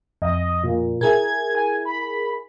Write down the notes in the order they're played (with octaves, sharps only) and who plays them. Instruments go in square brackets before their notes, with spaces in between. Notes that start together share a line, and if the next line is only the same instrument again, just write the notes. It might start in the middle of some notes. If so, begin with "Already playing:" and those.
[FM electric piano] F2 [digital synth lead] D#5
[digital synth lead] A#2
[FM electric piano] E4 G#4 A#4 [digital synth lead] G#6
[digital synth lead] G#5
B5